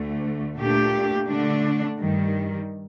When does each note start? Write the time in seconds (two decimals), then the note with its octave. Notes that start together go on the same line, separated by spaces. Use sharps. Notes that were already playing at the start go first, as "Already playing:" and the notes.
Already playing: D2 D3 A3
0.56 A#2 A3 D4 G4
1.27 D3 A3 D4
1.98 G2 D#3 G3